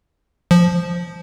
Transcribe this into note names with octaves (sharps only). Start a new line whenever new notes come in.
F3